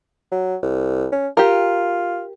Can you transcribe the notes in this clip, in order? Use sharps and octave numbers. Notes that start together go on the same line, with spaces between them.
F#3
C2
C#4
F4 G4 A#4